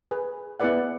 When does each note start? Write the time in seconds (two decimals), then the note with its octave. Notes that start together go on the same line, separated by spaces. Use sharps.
0.11 G#4 B4
0.60 B3 E4 G#4 B4 D5 F#5